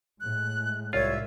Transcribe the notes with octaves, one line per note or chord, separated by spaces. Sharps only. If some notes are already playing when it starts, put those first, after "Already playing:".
A2 G#3 F#6
C2 F4 C#5 E5